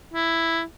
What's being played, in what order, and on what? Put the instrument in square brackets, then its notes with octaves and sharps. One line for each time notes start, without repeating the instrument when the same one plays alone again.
[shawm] E4